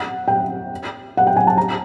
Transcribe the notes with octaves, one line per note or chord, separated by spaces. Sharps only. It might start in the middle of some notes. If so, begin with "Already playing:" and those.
Already playing: F#5
G5
F#5
G5
G#5
A5
A#5